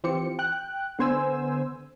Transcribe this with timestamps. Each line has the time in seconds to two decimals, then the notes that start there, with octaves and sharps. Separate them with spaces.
0.04 E3 C4 F4 G4 C#7
0.39 G5 F#6
0.99 D3 B3 C5 G#5 E6